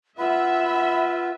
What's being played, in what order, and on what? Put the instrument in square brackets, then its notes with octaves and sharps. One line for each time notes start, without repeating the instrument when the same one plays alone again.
[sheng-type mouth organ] F4 B4 [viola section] E5 [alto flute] F#5 [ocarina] B5